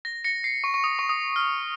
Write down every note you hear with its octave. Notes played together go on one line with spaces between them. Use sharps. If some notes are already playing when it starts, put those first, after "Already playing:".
A#6
A#6 C#7
C7
C#6
C#6
D#6
C#6
D#6
F6